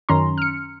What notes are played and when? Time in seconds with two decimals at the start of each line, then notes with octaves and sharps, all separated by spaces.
0.09 F#2 D#3 C#4 A#5 C6
0.38 F6 C#7